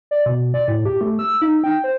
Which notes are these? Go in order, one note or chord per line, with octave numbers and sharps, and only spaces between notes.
D5
B2
D5
A2
G4
A3
E6
D#4
G5
C5